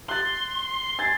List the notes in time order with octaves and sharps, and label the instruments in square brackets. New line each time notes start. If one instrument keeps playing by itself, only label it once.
[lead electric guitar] C6 [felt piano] F#6 A6
[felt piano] G#5 G#6 A6